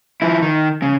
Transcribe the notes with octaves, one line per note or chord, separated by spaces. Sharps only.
F3 E4
D#3
C#3